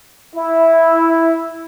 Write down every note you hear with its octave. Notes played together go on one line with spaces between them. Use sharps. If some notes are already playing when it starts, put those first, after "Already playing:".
E4